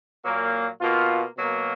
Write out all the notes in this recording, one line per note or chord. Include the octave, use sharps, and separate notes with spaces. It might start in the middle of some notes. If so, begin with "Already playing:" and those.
A#2 F#3 A#3
B2 A#3 F4
B2 F#3 A#3